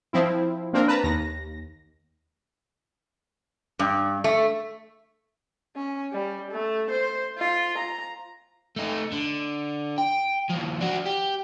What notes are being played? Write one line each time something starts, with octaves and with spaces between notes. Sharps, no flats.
F3 C4 E4
A#3 C4 D4 A#4
B4 A5 A#5
D#2 A#6
G2
A3
C#4
G3
A3
C5
F4
A#5
A3 D#4
D3
G5
D#2 F3
D4 F#4
G4